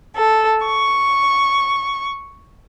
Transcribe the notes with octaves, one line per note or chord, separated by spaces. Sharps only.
A4
C#6